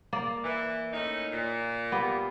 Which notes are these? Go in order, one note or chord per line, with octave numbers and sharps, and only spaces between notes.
A#3 D5
E3
A2 C#4 D#4
A#2
B3 G4